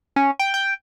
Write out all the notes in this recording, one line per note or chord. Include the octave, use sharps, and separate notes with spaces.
C#4
G5
G5